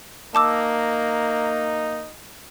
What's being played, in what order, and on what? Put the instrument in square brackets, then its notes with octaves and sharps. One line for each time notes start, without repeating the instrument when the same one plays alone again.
[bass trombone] A#3 [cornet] D#4 [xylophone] A5 D6 E6